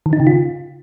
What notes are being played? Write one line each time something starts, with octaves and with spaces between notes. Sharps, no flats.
D#3
D#4
C#3
F4